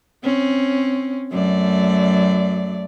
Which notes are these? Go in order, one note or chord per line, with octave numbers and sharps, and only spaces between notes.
C4 C#4
F#2 A3 D5